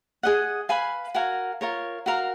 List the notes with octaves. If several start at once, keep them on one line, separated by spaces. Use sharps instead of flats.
G#4 D#5 F#5
B4 F5 G#5 B5
F#4 A#4 F5 G#5
F4 A#4 C#5
F#4 A#4 F5 A#5